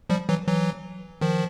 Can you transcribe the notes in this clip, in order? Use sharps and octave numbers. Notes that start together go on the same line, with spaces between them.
F3 G3
E3 F#3
E3 F#3
D#3 F3